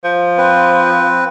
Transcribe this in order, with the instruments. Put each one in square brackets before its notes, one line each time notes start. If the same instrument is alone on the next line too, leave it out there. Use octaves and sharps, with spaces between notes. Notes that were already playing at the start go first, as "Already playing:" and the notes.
[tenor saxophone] F3
[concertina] C4 B4